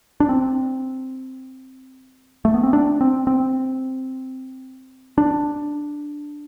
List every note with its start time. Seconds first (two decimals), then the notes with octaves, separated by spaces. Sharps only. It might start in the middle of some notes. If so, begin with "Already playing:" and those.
0.20 D4
0.29 C4
2.45 A3
2.54 B3
2.63 C4
2.73 D4
3.01 C4
3.27 C4
5.18 D4